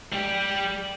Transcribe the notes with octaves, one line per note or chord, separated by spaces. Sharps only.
G3 G4